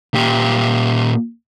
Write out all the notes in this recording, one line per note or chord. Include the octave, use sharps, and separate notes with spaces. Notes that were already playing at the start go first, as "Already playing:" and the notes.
A#2 G4